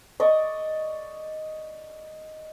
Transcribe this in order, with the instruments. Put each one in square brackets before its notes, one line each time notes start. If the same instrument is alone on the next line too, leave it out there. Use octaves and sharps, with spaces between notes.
[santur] D5 D#5 C#6